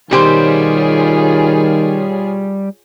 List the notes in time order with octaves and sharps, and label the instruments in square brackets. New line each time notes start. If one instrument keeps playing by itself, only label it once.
[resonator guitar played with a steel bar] B2 G4 C5 [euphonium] D#3 [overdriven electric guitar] G3 [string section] F4 G#4 C#5